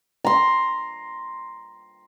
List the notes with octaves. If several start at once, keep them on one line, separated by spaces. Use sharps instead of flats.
A#5 C6